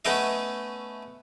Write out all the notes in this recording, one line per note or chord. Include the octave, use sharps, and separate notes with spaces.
A3 B3 C#4 D#5 E5